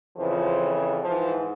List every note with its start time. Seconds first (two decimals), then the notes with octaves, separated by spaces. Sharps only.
0.16 F2 C#3 E3 F3
1.02 G#2 E3 F3